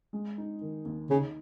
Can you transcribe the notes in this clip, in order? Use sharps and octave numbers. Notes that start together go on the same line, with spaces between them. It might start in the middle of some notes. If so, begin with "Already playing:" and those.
G#3
D#4
D#3
D#2
C#3 D#4